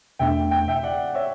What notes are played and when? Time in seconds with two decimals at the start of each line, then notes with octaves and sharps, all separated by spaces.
0.19 E2 B2 A3 D4 E5 G5
0.51 G5
0.68 E5 G5
0.83 D5 F#5
1.15 C#5 E5